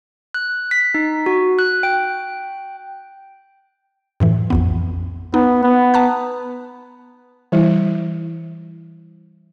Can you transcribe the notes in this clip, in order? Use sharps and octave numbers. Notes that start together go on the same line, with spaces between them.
F#6
B6
D#4
F#4
F#6
G5
F#2 A2 E3
A#1 F2 B3
B3 D#4
B3
A5 A#5 F#6
E3 G3 E4